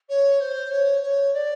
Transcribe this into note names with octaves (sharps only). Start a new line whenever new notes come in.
C#5
C5
C#5
C#5
D5